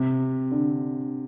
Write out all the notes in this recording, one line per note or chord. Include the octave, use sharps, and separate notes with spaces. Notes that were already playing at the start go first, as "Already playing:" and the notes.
Already playing: C3
D3